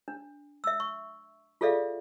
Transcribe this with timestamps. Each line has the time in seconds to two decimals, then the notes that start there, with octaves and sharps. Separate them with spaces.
0.08 D4
0.64 E5 E6
0.80 C#6
1.61 F4 G#4 A4 D5 E5 F5